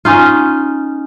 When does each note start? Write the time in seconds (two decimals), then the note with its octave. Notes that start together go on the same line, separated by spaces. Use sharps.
0.05 C#4 D#4 F4